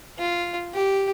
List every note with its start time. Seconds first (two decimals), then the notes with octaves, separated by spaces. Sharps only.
0.18 F4
0.74 G4